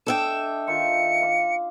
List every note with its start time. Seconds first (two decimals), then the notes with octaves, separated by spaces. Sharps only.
0.07 D4 A4 D#5 E5 G5 E7
0.68 D#3 F4 C#7
1.21 F5 D6